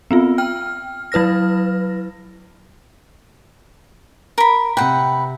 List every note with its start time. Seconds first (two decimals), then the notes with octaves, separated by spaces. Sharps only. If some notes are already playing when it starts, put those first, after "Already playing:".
0.11 B3 C4 F4
0.38 G5 F6
1.12 F#3 E4 B4 F6 A#6
4.38 A#4 B5
4.77 C3 B4 F#5 G5